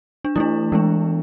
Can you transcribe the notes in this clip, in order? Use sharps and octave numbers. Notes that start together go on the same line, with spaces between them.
D4
E3 A3 D4 E4
E3 G#3 B3 D4